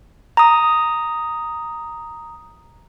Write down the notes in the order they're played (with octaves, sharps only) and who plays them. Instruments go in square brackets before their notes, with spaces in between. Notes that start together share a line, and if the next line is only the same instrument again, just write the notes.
[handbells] A#5 D#6